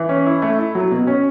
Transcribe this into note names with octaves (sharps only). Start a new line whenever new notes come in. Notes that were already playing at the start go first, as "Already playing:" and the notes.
Already playing: E3
C#4
E4
A3
E4
F#3
B2
C#4